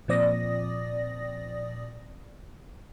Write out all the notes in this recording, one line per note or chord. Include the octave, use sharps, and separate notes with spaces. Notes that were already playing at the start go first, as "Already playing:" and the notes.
A#2 F3 C4 D5 D#6 A#6